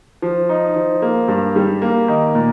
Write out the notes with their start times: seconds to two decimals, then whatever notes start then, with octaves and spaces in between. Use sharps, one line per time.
0.22 F3
0.49 D#4
0.76 F3
1.02 A#3
1.28 G2
1.56 G3
1.82 A#3
2.08 D#3
2.35 A#2